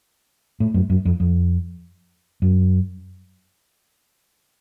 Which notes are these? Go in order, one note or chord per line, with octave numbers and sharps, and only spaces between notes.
A2
F#2
F#2
F2
F2
F#2